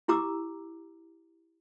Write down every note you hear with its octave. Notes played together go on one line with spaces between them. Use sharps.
E4 G4 A#5 D6 E6